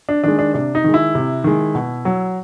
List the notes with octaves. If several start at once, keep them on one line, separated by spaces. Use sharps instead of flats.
D4
D#3 G#3 D4
D4
C3 D4
D#4
D#3 G#3
E4
C3
D#3 G#3
B2
F#3